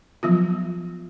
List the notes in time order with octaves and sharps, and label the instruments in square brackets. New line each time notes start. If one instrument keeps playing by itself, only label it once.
[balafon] F3 F#3 B3 F4